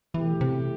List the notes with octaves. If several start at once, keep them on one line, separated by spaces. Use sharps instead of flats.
B2 E3 A3 E4 G4
C3